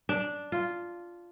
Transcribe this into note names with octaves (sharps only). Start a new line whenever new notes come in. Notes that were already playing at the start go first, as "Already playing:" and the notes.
D4
F4